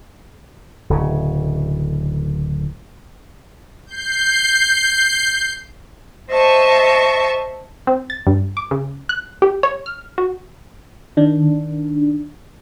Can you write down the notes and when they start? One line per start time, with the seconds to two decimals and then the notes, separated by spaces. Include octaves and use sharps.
0.90 D1 C#3
3.86 G6 C7
6.31 C5 D#5 E5 A5 C#6
7.87 C4
8.10 A6
8.27 G2
8.57 D6
8.71 C#3
9.09 F#6
9.42 G4
9.63 C#5
9.86 F6
10.18 F#4
11.17 D#3 D4